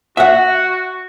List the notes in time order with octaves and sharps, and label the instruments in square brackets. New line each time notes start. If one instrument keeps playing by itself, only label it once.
[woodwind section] F#4 [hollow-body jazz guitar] E5 F#5